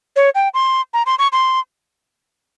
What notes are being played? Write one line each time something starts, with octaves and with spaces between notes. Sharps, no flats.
C#5
G5
C6
A#5
C6
C#6
C6